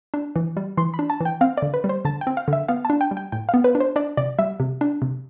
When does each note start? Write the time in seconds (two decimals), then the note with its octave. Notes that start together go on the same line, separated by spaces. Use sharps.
0.14 D4
0.36 E3
0.57 G3
0.77 E3 C6
0.94 B5
0.99 D4
1.10 A5
1.21 E3 G5
1.41 C4 F5
1.57 D3 D5
1.74 B4
1.84 G3
1.89 C5
2.05 D3 A5
2.21 G5
2.27 C4
2.37 F5
2.48 D3 E5
2.68 B3 F5
2.85 A5
2.90 D4
3.01 G5
3.11 G3
3.17 G5
3.32 A2 G5
3.49 B3 F5
3.64 B4
3.75 D4
3.80 C5
3.96 D4 D5
4.17 C3 D5
4.39 G3 E5
4.60 C3
4.81 D4
5.02 C3